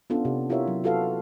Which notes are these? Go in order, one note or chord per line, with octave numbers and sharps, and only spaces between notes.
B3 C#4 D4 F4 A4
C3
E4 F4 G4 A#4 C#5 E5
F#3
F4 F#4 A4 B4 F5